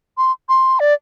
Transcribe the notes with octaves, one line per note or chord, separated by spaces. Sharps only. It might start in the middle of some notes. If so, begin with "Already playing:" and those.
C6
C6
D5